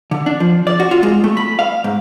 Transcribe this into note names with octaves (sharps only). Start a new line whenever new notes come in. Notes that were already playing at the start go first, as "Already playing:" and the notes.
D3
D4
F3
D5
F#4
F4
G#3
A3
B5
F5
G#2